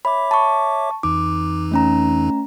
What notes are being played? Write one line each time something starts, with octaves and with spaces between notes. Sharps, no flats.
C#5 E5 B5 D6
A5 C#6
F2 E3 D#4 D6
A3 C#4 A#5